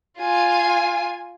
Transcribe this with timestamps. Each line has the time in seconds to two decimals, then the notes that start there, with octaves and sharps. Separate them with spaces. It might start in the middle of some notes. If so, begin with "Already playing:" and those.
0.19 F4 G#5